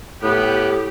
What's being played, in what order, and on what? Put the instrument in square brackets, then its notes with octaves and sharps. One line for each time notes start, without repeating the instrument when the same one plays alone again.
[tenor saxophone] A2 [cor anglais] B3 [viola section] G4